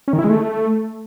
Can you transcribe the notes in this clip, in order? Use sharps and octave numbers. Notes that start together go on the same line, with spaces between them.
C#4
D#3
E4
G#3
A3